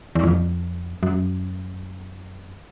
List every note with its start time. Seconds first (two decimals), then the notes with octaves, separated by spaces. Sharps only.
0.15 E2
0.24 F2
1.03 F#2